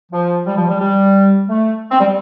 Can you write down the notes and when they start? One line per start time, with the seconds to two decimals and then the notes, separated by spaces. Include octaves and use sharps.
0.12 F3
0.46 G3
0.57 F3
0.69 G3
0.80 G3
1.48 A3
1.91 C4
2.00 G3